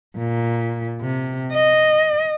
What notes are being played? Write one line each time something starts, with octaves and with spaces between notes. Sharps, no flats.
A#2
C3
D#5